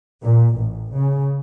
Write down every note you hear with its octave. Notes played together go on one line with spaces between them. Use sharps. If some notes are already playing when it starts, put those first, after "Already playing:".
A#2
A1
C#3